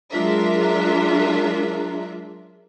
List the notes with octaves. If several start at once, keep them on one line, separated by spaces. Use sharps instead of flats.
F#3 G#3 D4 F4 A#4 E5